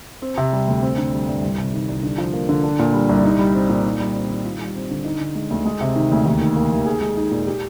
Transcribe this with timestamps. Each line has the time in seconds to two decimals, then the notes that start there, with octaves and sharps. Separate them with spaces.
0.22 C4
0.38 C3
0.53 G3
0.68 D2
0.82 C4
0.98 D3
1.13 G3
1.28 G2
1.42 C2
1.58 C3
1.74 D#3
1.88 C2
2.03 D3
2.18 F3
2.33 A#3
2.49 D3
2.64 D4
2.79 A#2
2.94 G3
3.09 C2
3.24 D#4
3.39 G3
3.54 C4
3.69 A#2
3.85 D#4
4.00 G3
4.15 C4
4.29 D#3
4.45 F4
4.60 G3
4.76 C4
4.91 D3
5.05 D#4
5.21 D3
5.35 G#3
5.51 D2
5.66 G#3
5.81 C3
5.96 D#3
6.11 D2
6.26 D#2
6.41 D#3
6.56 A#3
6.72 D#2
6.86 G#4
7.01 G#3
7.17 D#4
7.31 A#2
7.47 G4